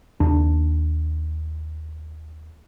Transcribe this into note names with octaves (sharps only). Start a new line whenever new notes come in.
D#2 D4